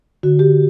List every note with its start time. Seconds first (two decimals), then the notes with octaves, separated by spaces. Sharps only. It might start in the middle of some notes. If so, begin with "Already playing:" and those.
0.23 D3 F#4
0.39 G4